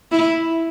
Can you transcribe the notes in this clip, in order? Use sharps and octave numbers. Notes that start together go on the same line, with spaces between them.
E4